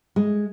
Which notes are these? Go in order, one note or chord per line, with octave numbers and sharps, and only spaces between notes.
G#3